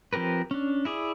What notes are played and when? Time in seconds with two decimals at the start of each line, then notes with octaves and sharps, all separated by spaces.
0.13 F3 C4 G4 A#4 B4
0.51 C#4 D4
0.85 E4 G#4 D5